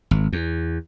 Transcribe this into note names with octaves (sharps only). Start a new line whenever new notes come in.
G#1
E2